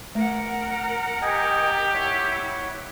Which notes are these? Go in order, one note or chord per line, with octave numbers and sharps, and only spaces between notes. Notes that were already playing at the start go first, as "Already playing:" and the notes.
A3 A#4 F#5
G4 D#5 G5 G#5
E4 C#5 F#5